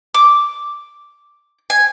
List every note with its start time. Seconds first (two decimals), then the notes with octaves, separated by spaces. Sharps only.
0.14 D6
1.70 G#5